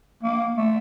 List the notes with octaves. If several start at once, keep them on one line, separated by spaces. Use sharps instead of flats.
A#3
A3